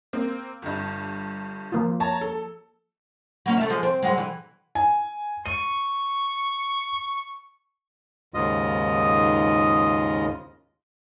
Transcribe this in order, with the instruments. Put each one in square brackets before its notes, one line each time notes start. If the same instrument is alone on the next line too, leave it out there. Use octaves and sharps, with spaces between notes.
[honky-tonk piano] A#3 C4
G1 G2
[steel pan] F3 A#3 F4
[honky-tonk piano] C#5 A5 A#5
A4
[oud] F#3 A#3 C#4
A3 E5
F3 G#3
C4
G2 F#3 G#3
E3
[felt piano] G#5
[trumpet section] C#6 [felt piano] D#7
[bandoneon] D#2 G#2 C#3 F4 D#5 D#6